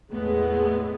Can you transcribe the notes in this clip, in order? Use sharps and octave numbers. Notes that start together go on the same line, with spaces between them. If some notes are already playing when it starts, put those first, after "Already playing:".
E2 A2 G#3 A3 B3